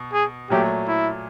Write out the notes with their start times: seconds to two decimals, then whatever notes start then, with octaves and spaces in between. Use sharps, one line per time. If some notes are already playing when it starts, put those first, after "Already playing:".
Already playing: B2
0.13 G#4
0.50 A#2 F#3 A3 G4
0.88 E4